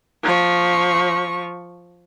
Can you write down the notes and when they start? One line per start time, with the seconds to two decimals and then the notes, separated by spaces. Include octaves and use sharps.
0.23 F3 C#6